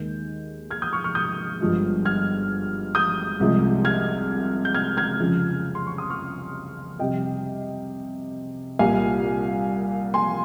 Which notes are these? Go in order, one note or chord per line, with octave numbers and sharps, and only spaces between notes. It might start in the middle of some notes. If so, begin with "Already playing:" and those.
Already playing: D#2 D#3 G#3 G6
F6 G#6
D#6 G6
C#6 F6
C#6 F6
D#6 G6
G1 G2 F3 G#3
F6 G#6
D#6 G6
C2 C3 F3 G#3
F6 G#6
G6
F6 G#6
F6 G#6
F2 C#3 F3
C6
C#6
D#6
C#6 F6
F2 C3 G3 D#5 G5
C2 A#2 G3 F5 G#5
G#5 C6